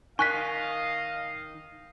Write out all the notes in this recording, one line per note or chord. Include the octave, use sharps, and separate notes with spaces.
D#3 D#5 F5 G#5 C#6 F#6 B6